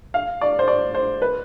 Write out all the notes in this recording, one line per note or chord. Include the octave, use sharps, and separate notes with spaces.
F5
D5
C5
D5
C5
B4